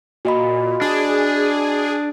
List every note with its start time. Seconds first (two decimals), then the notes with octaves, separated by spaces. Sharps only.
0.25 A#2 F#4 D#5 B5
0.81 D4 G#4